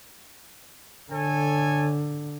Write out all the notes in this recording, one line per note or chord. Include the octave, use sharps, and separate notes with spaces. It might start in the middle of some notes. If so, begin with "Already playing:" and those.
D3 A4 C#5 G#5